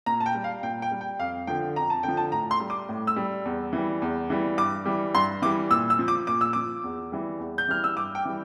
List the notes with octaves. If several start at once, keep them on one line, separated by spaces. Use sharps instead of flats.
A#2 A#5
A5
G5
G3
F5
A#2 G5
G5
G3
G5
F2 F5
D3 F3 G5
F2 A#5
A5
D3 F3 G5
A5
A2 A#5
C6
G3
D6
A2
E6
G3
E2
E3 G3
E2
E3 G3
G2 D6
E3 G3
G2 C6
E3 G3 D6
A#2 E6
E6
F3
D6
A#2 D6
E6
F3 D6
E2
E3 G3
E2
G6
E3 G3 F6
E6
G2 D6
G5
E3 G3